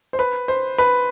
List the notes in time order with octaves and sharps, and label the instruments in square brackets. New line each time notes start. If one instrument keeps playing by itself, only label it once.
[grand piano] C5
B4
C5
B4